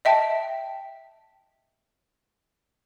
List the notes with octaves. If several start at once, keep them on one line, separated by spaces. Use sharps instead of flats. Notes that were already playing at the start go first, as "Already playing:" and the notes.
D#5 E5 G5 A5